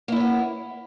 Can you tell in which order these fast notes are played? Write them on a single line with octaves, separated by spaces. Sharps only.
A#3 E4 C#4 B3